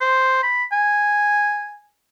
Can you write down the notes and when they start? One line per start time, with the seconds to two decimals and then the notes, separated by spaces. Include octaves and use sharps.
0.01 C5
0.43 B5
0.72 G#5